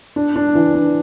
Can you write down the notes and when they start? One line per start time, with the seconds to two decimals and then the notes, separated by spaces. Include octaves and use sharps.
0.16 D4
0.36 D4
0.55 E3
0.74 D4